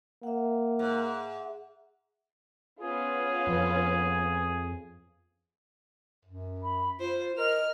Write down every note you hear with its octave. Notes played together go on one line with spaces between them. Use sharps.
A#3 E5 F#5
G#2
B3 C#4 F4 G#4
F2
F#2
B5
F4 C5
A#4 D#5 F6